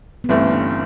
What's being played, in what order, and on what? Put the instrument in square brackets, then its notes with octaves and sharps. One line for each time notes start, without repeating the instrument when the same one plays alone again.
[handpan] B3
[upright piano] G1 G2 E3 A3 [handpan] C4
[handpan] C#4
D4